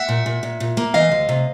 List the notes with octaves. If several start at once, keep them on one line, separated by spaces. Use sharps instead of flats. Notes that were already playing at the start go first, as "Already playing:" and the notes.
Already playing: E5 F#5
A#2
A#2
A#2
A#2
A#3
E3 D#5 F5
D2
C3